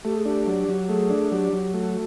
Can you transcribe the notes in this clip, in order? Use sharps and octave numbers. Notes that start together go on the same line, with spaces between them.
A3 G4
G#4
D4 G4
F#3
F#3
A3 G#4
D4
F#3 G4
F#3
A3 F#4